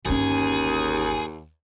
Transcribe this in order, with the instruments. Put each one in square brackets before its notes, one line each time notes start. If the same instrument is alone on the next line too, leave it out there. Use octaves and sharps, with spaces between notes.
[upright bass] G1 C#4 [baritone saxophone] D#2 [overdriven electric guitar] G#4